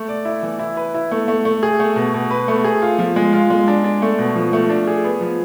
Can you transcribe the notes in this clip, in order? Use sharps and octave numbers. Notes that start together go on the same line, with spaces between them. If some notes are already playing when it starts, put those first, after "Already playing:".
Already playing: A3
D5
E4
E3
E4
B4
E4
A3
A3
A3
G#4
A3
B2
B2
B4
A3
G#4
F4
F3
G#3
F4
G#3
D4
D4
A3
B2
F3
A3
D4
G#4
B3
F3